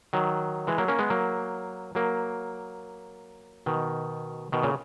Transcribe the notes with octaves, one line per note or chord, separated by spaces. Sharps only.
D#3 F#3
E3 G#3
F#3 A#3
A#3 C#4
G#3 B3
F#3 A#3
F#3 A#3
B2 D#3
B2 D#3
A#2 C#3